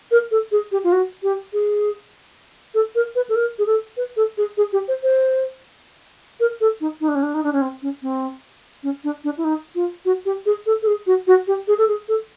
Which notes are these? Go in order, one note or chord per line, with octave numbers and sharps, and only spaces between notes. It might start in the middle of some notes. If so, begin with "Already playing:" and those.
A#4
A4
G#4
G4
F4
F#4
G4
G#4
A4
A#4
B4
A4
A#4
G#4
A4
B4
A4
G#4
G#4
G4
C5
C5
A#4
A4
D#4
D#4
D4
C#4
D4
D#4
D4
C#4
C4
C#4
C4
C#4
D4
D4
E4
D#4
F4
F#4
G4
G#4
A4
A4
G#4
F#4
F#4
G4
G#4
A4
G#4
A4